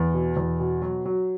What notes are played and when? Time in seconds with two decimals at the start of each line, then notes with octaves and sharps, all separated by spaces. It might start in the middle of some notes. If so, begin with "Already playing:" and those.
Already playing: E2
0.14 B2
0.37 E2
0.60 B2
0.82 F#3
1.05 F#3